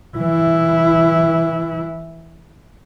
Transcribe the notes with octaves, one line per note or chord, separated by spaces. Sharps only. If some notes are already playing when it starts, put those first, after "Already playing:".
E3 E4